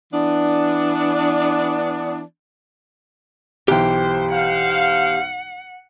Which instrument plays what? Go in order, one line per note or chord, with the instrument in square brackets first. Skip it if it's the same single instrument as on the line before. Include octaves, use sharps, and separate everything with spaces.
[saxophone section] E3 B3 D4
[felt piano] B1 E3 [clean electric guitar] G4 G5 [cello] C5
[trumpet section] C5 F5 [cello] F#5